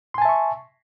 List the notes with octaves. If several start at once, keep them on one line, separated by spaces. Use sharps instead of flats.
E5 G#5 A5 C6 C#6